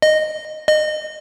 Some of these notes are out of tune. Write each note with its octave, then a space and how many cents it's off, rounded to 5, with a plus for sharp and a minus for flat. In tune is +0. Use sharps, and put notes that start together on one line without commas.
D#5 -10
D#5 -25